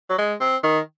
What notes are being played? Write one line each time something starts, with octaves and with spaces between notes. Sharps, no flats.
F#3
G#3
C4
D#3